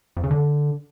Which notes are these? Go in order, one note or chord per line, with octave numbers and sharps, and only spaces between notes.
F2
C#3
D3